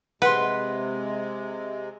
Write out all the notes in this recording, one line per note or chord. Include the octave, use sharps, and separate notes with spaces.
C3 G#3 B4 F#5 C6